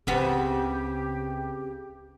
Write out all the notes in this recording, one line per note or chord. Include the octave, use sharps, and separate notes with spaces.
C#2 C#3 B3 C4 G4